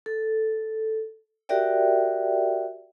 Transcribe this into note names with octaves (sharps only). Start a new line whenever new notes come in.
A4
F#4 G4 A#4 D5 E5 G5